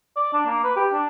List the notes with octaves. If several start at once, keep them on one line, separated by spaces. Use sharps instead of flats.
D5
D4
A#3
B4
G4
D4